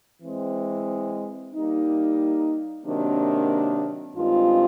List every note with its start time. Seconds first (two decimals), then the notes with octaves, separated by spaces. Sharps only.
0.23 E3 G#3 C4
1.54 G3 A#3 D#4
2.85 C3 D#3 F#3 A#3 D4
4.17 G2 D#3 G#3 C4 F4